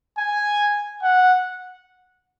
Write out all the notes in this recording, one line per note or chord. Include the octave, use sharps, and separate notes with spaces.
G#5
F#5